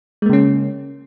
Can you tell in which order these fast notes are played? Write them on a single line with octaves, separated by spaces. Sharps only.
G#3 A#3 C#3 C#4